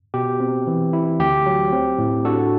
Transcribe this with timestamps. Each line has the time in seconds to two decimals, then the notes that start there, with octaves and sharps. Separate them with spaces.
0.14 B2 G4
0.40 C4
0.67 E3
0.93 E4
1.19 D2 G4
1.46 F#3
1.72 C4
1.99 A2
2.25 D4 F#4 A4